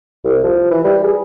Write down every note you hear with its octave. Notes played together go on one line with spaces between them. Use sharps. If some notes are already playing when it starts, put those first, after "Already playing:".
C2
F3
E3
G3
G#4